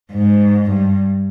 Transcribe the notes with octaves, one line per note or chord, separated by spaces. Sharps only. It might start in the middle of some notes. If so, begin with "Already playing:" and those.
G#2
G2